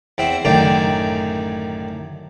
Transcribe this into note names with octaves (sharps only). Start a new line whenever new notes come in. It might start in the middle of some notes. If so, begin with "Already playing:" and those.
E2 C4 E5 F#5
A1 F#2 D3 D#3 D5 G5